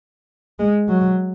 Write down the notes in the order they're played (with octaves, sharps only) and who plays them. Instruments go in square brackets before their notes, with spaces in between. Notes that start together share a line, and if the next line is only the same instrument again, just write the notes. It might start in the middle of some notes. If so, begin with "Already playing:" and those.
[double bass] G#3
F#3